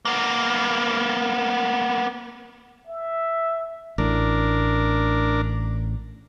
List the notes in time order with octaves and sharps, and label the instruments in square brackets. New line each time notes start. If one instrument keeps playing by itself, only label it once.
[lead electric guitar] A#3 B3
[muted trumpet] E5
[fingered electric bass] A1 A2 [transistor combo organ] D4 A#4